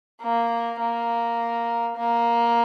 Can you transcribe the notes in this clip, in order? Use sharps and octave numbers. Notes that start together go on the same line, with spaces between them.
A#3
A#3
A#3